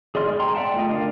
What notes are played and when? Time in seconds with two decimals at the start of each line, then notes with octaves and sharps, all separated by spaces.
0.15 G#4 D5 D#5 C6 F6
0.27 G#3
0.40 G5 A#5 C6
0.55 D5 E5 F#5 G5 A5
0.74 A3 F4 D#5
0.89 D3 G4 A#4 D5 F5